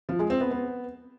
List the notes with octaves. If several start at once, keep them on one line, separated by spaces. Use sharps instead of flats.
F3
G#3
C4
B3
B3